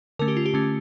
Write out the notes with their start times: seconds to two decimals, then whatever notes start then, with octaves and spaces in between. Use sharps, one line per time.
0.19 D3 A3 C#4 A#4
0.28 G4
0.37 F4
0.46 G4
0.54 D3 A3 C#4